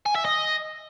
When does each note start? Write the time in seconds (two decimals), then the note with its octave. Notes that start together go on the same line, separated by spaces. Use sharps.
0.06 G#5
0.15 E5
0.25 D#5